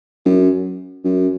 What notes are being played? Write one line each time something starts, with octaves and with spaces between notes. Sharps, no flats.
F#2
F#2